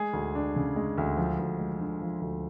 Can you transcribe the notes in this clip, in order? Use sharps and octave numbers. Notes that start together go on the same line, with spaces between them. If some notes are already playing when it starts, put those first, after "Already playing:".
Already playing: G#3 G#4
D2
D4
C#3
G#3
D2
F3
D2
G#3
D3
F3
D2